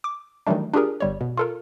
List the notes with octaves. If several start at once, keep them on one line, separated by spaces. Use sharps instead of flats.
D6
D#3 E3 F#3 G3 A3 D4
D4 F4 G4 G#4 A#4
G1 G3 C#5
B2
F4 A4 A#4